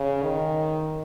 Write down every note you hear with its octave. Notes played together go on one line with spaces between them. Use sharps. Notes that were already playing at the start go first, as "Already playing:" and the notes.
Already playing: C#3
D#3